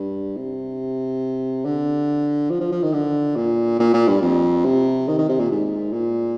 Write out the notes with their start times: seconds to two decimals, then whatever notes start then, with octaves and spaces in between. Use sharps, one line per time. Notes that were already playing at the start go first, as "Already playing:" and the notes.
Already playing: G2
0.37 C3
1.65 D3
2.50 F3
2.61 F3
2.71 F3
2.83 D#3
2.93 D3
3.36 A#2
3.80 A#2
3.94 A#2
4.07 G2
4.22 F2
4.65 C3
5.08 D#3
5.18 D#3
5.29 C3
5.39 A#2
5.51 G#2
5.93 A#2